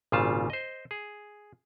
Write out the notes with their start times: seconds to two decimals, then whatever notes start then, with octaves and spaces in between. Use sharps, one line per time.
0.12 G#1 A#2 C#3 G3 F4 A5
0.50 C5 D#5
0.91 G#4